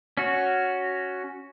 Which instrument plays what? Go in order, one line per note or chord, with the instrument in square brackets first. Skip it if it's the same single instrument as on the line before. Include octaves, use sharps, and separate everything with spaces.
[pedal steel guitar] C#4 F#4